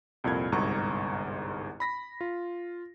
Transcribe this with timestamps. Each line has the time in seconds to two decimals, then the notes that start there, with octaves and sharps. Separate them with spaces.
0.24 C2 F2 A#2 F6 G#6
0.52 G1 C2 G#2 A#5 C#6
1.80 B5 A#6 B6
2.21 F4